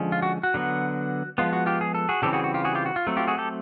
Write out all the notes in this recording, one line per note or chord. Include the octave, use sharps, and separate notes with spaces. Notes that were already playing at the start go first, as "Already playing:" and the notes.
Already playing: D3 F3 G#3 C#4
F4
F#4
F#4
D3 F#3 B3
F3 G#3 B3 F4
F#4
F4 G4
G#4
A4
F#4 G#4
C#3 E3 G3 C4 G4 A4
F#4 G#4
F#4
F4 G4
F#4 G#4
F4 G4
F#4
F4
F#3 A3 C4
F4 G4
F#4 G#4
G4 A4